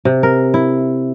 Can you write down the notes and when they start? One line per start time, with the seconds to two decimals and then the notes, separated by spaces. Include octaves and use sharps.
0.05 C3
0.23 A#4
0.54 E4